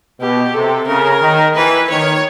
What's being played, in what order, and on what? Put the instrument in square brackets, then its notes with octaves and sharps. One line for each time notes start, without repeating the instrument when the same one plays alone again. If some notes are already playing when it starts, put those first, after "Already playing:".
[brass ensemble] B2 [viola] G4
[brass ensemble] C3 [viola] A4
[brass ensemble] C#3 [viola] A#4
[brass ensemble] D#3
[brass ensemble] E3 [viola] B4
[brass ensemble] D#3 [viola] C#5